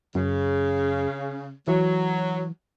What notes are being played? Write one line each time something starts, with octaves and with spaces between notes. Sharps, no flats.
F#2 C#3
E3 F#3